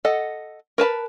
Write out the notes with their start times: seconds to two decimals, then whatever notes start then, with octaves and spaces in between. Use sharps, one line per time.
0.05 A4 D#5 F#5
0.78 A#4 B4 A5 B5